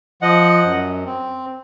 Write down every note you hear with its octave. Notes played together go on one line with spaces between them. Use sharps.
F3 D#5 F#5
F#2
C4